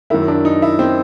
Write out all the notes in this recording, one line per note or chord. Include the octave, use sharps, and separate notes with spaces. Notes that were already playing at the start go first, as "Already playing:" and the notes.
F#2 D#3 E4
D4
D#4
E4
C4